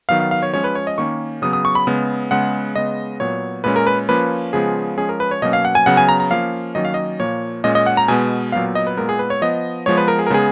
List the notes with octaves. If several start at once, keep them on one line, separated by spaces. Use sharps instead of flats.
D#3 F#3 B3 F5
F5
F5
C#5
F3 G#3 C#4 C#5
B4
C#5
D#5
D#3 A#3 C#4 C#6
C#3 F#3 B3 D#6
D#6
C#6
B5
C#3 G#3 B3
C#3 G#3 B3 F#5
C#3 G#3 B3 D#5
A#2 F#3 B3 C#5
A#2 G#3 C#4 B4
A#4
B4
F3 A#3 C#4 B4
C#3 F3 G#3 B3 G#4
F3 G#3 C#4 G#4
A#4
B4
C#5
B2 F#3 A#3 C#4 D#5
F5
F#5
G#5
C#3 F#3 B3 F#5
G#5
A#5
A#5
F3 A#3 C#4 F5
D#3 F#3 A#3 C#4 D#5
F5
D#5
A#2 F3 A#3 C#5
A#2 G#3 C#4 D#5
D#5
F#5
A#5
B2 G#3 B3 G#5
A#2 F#3 B3 F5
D#5
B4
A#2 G#3 B3 A#4
G#4
B4
C#5
F3 B3 D#5
F3 G#3 B3 C#5
B4
A#4
G#4
A#4
C#3 G#3 B3 G#4